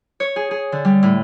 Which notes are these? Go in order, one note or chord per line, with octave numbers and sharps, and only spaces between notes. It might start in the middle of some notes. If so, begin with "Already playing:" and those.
C#5
G#4
G#4
D3
G3
A2